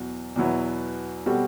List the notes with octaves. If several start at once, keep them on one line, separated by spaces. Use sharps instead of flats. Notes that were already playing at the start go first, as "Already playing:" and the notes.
Already playing: E2 B2 F#3 E4
E2 B2 F#3 B3 E4
B2 G3 C4 F#4 A4